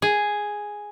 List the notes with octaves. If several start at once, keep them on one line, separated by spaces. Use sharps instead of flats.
G#4